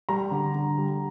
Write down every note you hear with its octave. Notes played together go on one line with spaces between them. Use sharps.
G3 A#5
D3
D3
G3